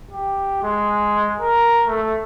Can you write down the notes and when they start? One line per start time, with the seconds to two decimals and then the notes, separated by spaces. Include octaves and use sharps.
0.11 G4
0.63 G#3
1.41 A#4
1.86 A3